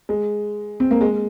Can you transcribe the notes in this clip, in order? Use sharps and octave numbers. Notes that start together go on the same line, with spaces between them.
G#3
C4
A#3
G#3